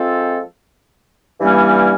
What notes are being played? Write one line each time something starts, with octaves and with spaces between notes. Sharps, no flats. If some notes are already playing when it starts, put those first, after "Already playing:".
Already playing: F3 G#3 C4 F4 A4
G2 E3 G3 A#3 C#4